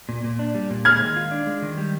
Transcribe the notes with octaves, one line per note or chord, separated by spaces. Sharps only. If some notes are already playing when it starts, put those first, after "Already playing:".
A#2
A#2
D4
G3
A#2
G#3 F6 G#6
D#3
F4
D4
G#3
D#3
G3